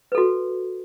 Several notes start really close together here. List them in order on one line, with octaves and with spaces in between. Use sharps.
B4 A4 F#4